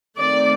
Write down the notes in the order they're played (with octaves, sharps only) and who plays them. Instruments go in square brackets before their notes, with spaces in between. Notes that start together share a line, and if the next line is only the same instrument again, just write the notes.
[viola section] D#3 A3 C4 D5